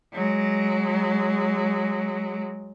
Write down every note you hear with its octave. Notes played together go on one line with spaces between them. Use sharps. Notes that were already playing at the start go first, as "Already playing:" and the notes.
F#3 G#3